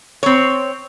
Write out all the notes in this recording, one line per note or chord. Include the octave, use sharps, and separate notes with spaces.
C4 C#5